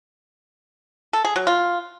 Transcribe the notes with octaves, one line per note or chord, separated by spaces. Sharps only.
A4
G#4
F#3
F4